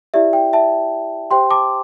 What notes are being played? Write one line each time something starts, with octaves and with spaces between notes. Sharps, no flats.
E4 G4 D5 E5
G5
E5 A5
G4 C5 G5 C6
A5 D6